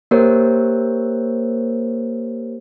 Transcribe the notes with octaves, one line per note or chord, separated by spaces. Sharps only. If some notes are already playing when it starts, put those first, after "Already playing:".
A#3 G4 A#4 C5 C#5